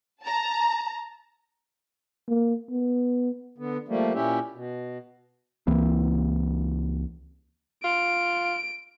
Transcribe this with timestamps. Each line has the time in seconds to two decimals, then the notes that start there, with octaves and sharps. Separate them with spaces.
0.23 A5 A#5
2.28 A#3
2.70 B3
3.58 D3 B3
3.89 F3 G3 A3 A#3
4.14 A#2 C#4 E4 G4 E5
4.55 B2
5.67 C#2 E3 A#3 C4
7.84 F4 D7